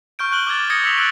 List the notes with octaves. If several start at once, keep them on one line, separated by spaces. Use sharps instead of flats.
C#6 F6 G6 D7
F#6 D7 F#7 G7
D6 F6 G#6 A6
D#6 G#6 A#6 C#7
C#6 E6 B6 F7 G7
E6 F#6 A6 D7